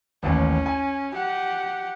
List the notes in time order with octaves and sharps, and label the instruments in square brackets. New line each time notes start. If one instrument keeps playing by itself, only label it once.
[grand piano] A1 D#2 [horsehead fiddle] C#4
[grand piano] G#5
[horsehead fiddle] G4 F#5